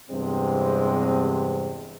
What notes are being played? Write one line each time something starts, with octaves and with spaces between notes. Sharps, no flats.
E2 G2 C3 G#3 C4